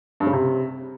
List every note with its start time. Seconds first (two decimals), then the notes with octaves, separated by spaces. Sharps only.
0.20 G2
0.27 C#3
0.33 C3